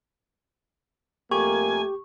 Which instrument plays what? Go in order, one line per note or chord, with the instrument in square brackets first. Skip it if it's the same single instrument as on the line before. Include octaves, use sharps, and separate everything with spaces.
[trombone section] F2 A3 A#3 [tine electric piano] G4 [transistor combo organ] G#5 [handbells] C#6